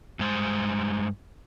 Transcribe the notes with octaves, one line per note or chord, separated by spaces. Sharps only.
G2 G#3 C5